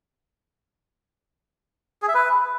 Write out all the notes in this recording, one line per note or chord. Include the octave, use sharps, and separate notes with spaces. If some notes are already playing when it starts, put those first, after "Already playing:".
G#4
E5
B4